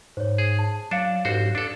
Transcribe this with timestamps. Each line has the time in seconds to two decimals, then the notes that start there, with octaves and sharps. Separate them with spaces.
0.17 G#2 C5 C#5
0.38 G#4
0.59 A5
0.91 F#3 D4 F5 C#7 E7
1.25 A1 G#2 F#4 C5
1.55 G2 D4 A4